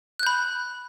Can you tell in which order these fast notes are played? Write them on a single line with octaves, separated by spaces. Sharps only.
F#6 G6 B5